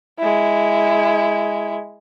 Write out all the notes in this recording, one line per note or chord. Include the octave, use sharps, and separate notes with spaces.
G#3 E4